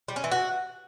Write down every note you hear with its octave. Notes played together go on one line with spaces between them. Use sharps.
G3
C#4
E3
F#4